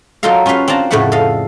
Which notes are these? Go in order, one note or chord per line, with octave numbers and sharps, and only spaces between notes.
F#3 D#4 F4 A4 A#4 F5
C#4 F4 G4 B4 F5
C4 D4 F5 A5 A#5
F2 A2 C#3 A3 B4 F#5
A4 D#5 F5